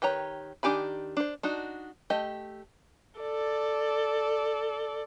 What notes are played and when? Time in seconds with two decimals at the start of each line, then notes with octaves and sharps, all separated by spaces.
0.02 D#3 G4 B4 C#5 A#5
0.63 D#3 D4 G4 G#5 B5
1.17 D4 C5
1.43 D4 D#4 F#4
2.10 A3 G4 D#5
3.20 A4 D5